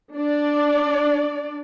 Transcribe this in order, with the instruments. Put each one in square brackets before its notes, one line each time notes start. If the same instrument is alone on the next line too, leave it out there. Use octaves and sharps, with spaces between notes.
[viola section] D4 D5